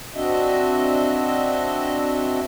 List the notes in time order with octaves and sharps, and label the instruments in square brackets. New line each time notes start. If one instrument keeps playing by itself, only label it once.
[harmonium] C4 D4 F#4 D#5 E5